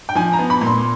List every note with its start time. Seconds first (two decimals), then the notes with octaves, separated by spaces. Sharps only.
0.09 G5
0.15 F3 G#5
0.33 A#5
0.39 B3
0.50 B5
0.61 A#2
0.67 C6